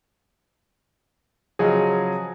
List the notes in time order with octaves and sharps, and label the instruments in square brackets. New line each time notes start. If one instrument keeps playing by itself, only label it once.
[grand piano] C#3 F3 F#3 [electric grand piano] G#4 D#5